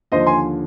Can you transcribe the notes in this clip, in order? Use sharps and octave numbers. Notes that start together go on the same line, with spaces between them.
D#2 D3 F3 C5 D#5
G#5 C6